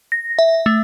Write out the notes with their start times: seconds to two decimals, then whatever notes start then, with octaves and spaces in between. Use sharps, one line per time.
0.12 A#6
0.39 E5
0.66 A3